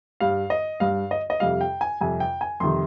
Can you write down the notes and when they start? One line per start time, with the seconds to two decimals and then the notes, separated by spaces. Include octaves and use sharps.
0.20 G2 G3 F5
0.50 D#5
0.80 G2 G3 F5
1.11 D#5
1.30 D#5
1.40 F2 C3 G3 F5
1.61 G5
1.81 G#5
2.01 F2 C3 G3 G#5
2.20 G5
2.41 G#5
2.60 F2 C3 D#3 G3 C6